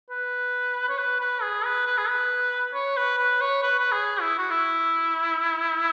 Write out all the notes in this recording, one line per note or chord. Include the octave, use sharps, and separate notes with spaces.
B4
C#5
B4
B4
G#4
B4
B4
G#4
B4
C#5
B4
B4
C#5
B4
B4
G#4
E4
F#4
E4